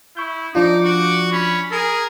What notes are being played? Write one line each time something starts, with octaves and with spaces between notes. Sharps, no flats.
E4 C#6 G6
F3 D4 D#4 F4 D6
F#4
C#4 B5
G#4 A#4